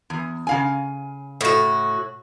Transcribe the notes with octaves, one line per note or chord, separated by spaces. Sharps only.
E2
C#3 F5 G#5
A2 F#4